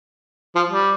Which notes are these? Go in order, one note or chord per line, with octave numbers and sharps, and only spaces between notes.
F3
G3